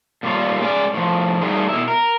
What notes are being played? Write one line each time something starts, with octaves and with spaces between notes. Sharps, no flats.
A#2 D3 G3 F4 C#5
G#3 C#4 D5
A2 F3
F#3 G3 A3 A#3 D#4 G#4
B2 E4
A#4